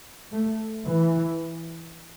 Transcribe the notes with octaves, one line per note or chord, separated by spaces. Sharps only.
A3
E3